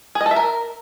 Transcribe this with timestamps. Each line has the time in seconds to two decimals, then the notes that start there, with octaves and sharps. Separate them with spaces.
0.15 G#4
0.21 D#5
0.26 A4
0.31 E5
0.36 A#4